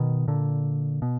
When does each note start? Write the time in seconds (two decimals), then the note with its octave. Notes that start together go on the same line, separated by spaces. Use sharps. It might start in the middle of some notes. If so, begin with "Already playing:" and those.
Already playing: B2 D#3
0.28 A#2 D3
1.02 B2